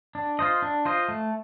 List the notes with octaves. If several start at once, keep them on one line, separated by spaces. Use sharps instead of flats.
D4
F4 C5 D#5
D4
F4 C5 D#5
A3